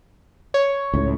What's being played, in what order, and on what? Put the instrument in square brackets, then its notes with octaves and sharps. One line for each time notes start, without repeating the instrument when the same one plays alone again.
[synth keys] C#5
[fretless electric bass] C#2 A2